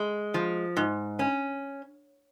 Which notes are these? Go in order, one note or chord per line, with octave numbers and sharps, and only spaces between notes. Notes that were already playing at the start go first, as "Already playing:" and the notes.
Already playing: G#3
F3
G#2
C#4